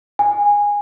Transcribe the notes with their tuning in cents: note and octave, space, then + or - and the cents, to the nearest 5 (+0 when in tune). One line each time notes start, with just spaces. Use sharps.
G#5 -15